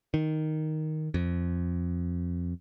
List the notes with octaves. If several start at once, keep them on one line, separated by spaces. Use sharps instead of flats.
D#3
F2